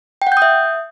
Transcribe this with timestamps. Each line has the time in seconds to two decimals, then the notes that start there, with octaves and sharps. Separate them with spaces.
0.22 G5
0.27 F#5
0.32 G6
0.37 D#6
0.42 E5